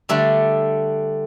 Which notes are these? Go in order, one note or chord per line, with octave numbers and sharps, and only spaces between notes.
D3 G3 A3 D4